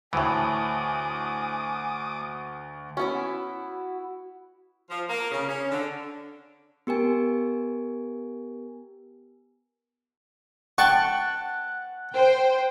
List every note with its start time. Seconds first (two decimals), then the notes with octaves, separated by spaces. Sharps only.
0.13 D2 A2 E3 G#5 D6 D#6
2.97 B3 C#4 E4 F#4
4.90 F3
5.10 A#3
5.31 C#3
5.49 C#4
5.71 D3
6.87 B3 G4 A#4 G#5
10.78 F#5 G5 A5 C#6
12.14 C5 G5